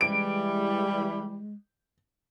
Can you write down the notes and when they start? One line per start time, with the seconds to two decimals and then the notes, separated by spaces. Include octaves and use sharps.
0.01 E3 G3 G#3 D7